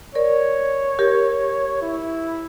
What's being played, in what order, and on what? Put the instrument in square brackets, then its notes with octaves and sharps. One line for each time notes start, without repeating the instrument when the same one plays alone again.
[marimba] A#4 D5 [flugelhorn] C#5
[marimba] G4 A#4
[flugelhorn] E4